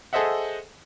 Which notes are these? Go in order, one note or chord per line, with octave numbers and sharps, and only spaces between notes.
G#4 A4 C5 D#5 E5 F#5